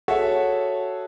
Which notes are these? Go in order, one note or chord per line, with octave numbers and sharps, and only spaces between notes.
F#4 G#4 A4 C#5 E5 F#5